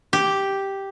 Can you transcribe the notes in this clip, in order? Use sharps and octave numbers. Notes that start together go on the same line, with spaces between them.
G4